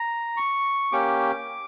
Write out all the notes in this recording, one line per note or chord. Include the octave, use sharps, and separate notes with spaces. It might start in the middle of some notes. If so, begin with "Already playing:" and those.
Already playing: A#5
C#6
A#3 C#4 G4 D6